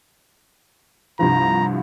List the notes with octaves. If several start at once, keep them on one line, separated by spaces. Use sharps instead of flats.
C2 G2 F3 A#5